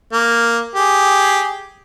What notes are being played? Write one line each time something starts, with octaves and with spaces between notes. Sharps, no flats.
A#3
G4 G#4